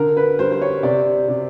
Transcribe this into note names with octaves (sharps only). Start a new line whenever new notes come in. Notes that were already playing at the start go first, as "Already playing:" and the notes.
Already playing: D3 A#4
B4
G3 C5
C5
C#5
C3 D5
C3